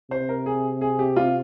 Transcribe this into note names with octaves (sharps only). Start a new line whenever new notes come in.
C3 C5
A#4
G#4
G#4
G4
F4